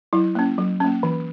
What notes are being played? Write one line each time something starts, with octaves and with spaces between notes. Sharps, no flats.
F#3 E4
A#3 C#4
F#3
A#3 C#4
E3